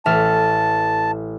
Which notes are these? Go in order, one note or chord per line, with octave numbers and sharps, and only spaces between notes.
A1 E5 A5 F6